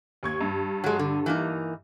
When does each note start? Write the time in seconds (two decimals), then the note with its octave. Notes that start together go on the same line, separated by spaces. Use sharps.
0.23 D#2 C#6 G#6
0.41 G2
0.84 F#3 G#3
0.99 D3
1.26 E3 A#3 D#4